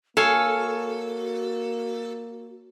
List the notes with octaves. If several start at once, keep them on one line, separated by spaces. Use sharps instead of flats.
A#3 F#4 A4 C#5 F5 G#5